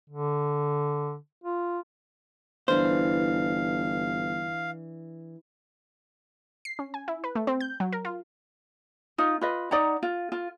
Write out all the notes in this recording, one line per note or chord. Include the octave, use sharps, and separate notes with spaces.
D3
F4
G1 E3 D4 C5 F5
C7
C#4
G#5
E4
B4
A3
C4
G6
F#3
A#4
F4
D#4 F4
F4 B4 D#5
D#4 D5 F#5 A#5
F4
F4